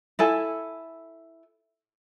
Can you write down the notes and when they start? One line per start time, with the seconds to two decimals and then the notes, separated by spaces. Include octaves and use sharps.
0.19 E4 A4 G#5